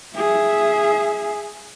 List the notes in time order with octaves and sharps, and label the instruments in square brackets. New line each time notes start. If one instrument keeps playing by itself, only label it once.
[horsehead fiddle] G#4 E5